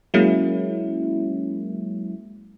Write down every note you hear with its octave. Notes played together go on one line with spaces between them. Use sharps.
F#3 G#3 A#3 C#4 E4